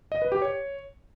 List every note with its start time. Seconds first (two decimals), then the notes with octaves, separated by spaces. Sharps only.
0.12 D#5
0.22 B4
0.32 G4
0.42 C#5